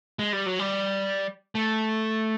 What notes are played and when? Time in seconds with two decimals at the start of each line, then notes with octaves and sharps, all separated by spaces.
0.19 G#3
0.33 G3
0.46 F#3
0.59 G3
1.55 A3